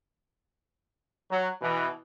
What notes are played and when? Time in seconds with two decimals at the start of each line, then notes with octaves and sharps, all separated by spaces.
1.30 F#3
1.61 B2 E3